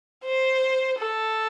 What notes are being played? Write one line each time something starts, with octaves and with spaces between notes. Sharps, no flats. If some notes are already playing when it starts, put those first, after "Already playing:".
C5
A4